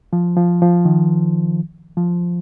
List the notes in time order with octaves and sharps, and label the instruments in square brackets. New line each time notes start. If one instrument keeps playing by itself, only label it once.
[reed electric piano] F3
F3
F3
D#3
F3